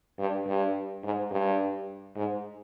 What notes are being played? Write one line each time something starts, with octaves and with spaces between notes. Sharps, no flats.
G2
G2
G#2
G2
G#2